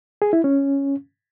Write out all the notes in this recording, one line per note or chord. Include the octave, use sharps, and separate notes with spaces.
G#4
E4
C#4